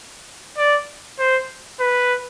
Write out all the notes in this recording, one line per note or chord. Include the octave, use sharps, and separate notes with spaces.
D5
C5
B4